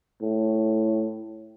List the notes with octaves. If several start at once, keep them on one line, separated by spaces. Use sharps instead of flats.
A2